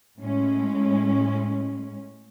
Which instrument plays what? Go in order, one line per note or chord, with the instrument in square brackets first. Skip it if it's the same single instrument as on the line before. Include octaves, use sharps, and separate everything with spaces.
[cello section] A2 G#3 C#4